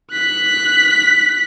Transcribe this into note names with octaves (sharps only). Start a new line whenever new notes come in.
F#6 B6